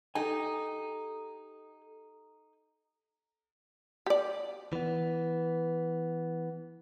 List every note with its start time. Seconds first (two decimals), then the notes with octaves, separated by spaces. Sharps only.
0.15 D#4 G4 A4 G#5
4.06 G4 D5
4.73 E3 B3